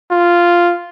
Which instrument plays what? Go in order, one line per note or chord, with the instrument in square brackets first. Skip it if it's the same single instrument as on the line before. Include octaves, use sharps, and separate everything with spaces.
[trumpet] F4